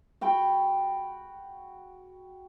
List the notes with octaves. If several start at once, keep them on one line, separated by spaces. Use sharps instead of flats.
F#4 G5 B5 C#6